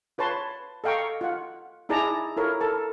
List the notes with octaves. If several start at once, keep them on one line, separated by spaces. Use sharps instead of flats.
F4 B4 C#5 A5 C6
A4 D#5 F5 G5 A#5 C#6
F4 F#5
D#4 E4 G#4 D5 A5 A#5
E4 F4 A4 A#4 C#5
A4 A#4 A5